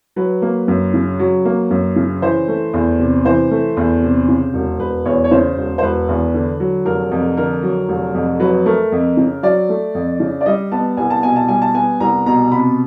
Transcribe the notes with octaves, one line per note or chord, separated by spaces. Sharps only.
F#3 B4
A#3
F#2
C#3
F#3
A#3
F#2
C#3
E3 C5
A3
E2
C3
E3 C5
A3
E2
C3
C#3
E1
E1 B4
E2 C#5
C#5
C#3 C5
E1
C5
E1 B4
E2
D3
F#3
F1 A#4
F2
D3 A#4
F#3
F1
F2
F#3 B4
A3 A#4
F2
C#3
F#3 D5
A3
F2
C#3
D5
G3 D#5
B3 A5
C2 G#5
A5
B2 G#5
A5
G3 G#5
A5
B3 G#5
C2 A#5
B2 A#5
C3 B5